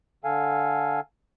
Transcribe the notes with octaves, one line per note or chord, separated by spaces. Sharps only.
D3 A4 F5 G#5